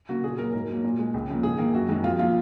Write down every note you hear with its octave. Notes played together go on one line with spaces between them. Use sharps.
C#3 F#3 A#3 F#4
A#2 G#4
F#3 A#3 A#4
G#2 A#4
F#3 A#3
A#2
G#3
C#2
C#3 F3 A#3
G#2 G#4
D#3 A#3
F#2 F#4
D#3 G#3
F2 F4
F3 A#3 F4